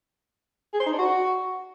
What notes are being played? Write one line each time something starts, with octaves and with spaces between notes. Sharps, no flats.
G#4
C5
D#4
D4
F#4